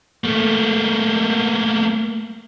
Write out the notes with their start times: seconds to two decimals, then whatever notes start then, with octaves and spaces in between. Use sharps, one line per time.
0.24 A3 A#3